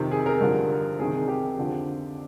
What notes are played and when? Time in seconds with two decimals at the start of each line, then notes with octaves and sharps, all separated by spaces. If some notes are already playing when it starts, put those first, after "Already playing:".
Already playing: F2 C3 D#3
0.11 G#4
0.26 A#4
0.41 G2 D3 F3
0.99 C2 C3 D#3 G#4
1.28 G4
1.58 F2 D3 F3